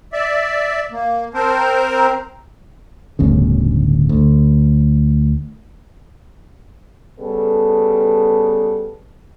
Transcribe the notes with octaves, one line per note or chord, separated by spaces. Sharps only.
D5 E5
A#3
C4 A#4 C5 A5
A#5
D1 G1 D2 C#3
D2
C#3 G3 B3 A4